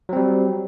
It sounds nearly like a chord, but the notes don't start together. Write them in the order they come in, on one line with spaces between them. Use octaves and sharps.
F#3 C4 G3